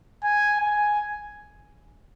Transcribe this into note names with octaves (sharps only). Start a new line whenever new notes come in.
G#5
G#5